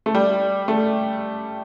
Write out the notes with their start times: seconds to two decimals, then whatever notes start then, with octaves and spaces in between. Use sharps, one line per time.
0.06 A3
0.15 G3
0.68 A3